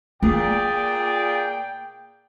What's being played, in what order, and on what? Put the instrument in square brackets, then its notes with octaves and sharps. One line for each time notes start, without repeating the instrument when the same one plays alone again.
[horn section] A#2 G#4 D5 [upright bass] A#3 [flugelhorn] G5